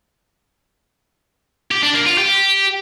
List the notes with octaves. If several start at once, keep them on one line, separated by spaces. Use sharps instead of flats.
G4
D4
A#3
F4
G4